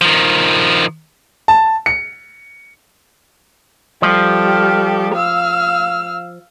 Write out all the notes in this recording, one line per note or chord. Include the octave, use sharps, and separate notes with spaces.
D#3 F3
A5
C#7
F3 G3 G4 A4
F5 E6 F6